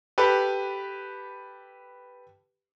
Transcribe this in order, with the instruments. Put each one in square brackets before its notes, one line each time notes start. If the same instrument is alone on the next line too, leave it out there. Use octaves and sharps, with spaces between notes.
[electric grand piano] G4 A4 B4